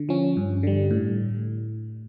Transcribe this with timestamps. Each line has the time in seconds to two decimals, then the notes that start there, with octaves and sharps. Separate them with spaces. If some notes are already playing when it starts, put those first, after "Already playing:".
Already playing: D3
0.09 F3 C#4
0.37 G2
0.63 D3 G3
0.91 A2